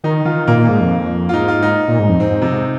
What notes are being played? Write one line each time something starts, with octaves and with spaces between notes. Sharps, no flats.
D#3 D#4
D#3 F4
A#2 A#3
A#2
G#2
F2
F4
G#2 D#4
F4
D#4
A#2
G#2
F2
G#2 C4
G#2
F2 C3
G#2